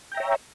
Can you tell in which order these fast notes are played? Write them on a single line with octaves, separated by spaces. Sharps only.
G5 A#5 E5 C#5